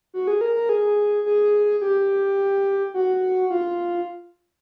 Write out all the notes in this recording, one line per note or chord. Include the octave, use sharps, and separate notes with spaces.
F#4
G#4
A#4
A#4
G#4
G#4
G4
F#4
F4